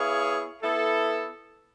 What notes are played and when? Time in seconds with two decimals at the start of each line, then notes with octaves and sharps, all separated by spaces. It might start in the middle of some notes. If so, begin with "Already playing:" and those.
Already playing: B3 E4 G#4 C#5 F5
0.62 B3 E4 A4